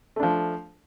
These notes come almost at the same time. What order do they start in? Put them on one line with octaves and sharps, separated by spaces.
A3 D4 F3